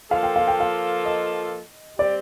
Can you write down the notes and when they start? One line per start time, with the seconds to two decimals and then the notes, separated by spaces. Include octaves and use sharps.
0.10 F3 A#3 F4 A4 F5
0.23 G5
0.36 F5
0.48 G5
0.60 F5
1.05 D#5
1.98 G3 C4 G4 D5